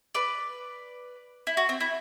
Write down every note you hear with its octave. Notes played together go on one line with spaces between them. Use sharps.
B4 D5
E4
F#4
C4
E4